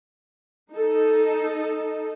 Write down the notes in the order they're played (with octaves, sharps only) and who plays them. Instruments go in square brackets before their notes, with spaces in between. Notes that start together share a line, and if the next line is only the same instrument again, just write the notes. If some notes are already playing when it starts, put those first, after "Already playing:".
[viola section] D#4 A4